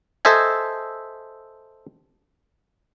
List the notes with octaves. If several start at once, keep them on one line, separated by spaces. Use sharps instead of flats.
A4 C5 D#5 E5 G#5